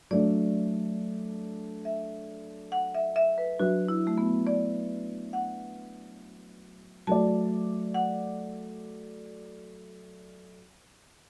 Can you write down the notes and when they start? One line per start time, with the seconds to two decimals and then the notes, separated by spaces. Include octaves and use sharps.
0.11 F#3 A3 D4 D5
1.85 E5
2.72 F#5
2.94 E5
3.16 E5
3.38 B4
3.59 F#3 D4 F#4 B4 E5
3.88 E4
4.07 A3
4.18 B3
4.47 D5
5.33 F#5
7.07 F#3 A3 F#4 D5 A5
7.94 F#5